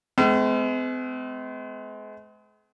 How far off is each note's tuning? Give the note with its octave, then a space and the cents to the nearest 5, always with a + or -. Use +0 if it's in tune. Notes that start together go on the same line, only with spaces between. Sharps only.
G#3 +35 C4 -45 E6 +45